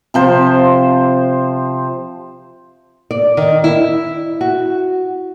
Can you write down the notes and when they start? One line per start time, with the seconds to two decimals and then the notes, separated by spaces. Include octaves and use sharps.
0.14 C3 F3 C5
3.11 D5
3.37 D#3
3.64 E4
4.41 F#4